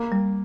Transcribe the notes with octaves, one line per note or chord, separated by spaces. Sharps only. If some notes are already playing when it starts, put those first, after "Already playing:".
Already playing: A#3
G3